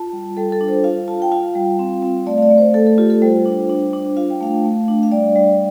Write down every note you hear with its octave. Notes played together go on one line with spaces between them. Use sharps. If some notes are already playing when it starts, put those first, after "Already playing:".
Already playing: F4 A5
G3
G3 A4
A4
D4
C5
F4 F5
F4 A5
G5
F4 F5
G3
C4
C4
A3 D5
F5
D5
A3
C5
A3 A4
A4
F4 G4
A4
G3 C5
D4
D4
D4
F4 F5
G5
A3 F5
A3
D4
F5
G3 D5
G3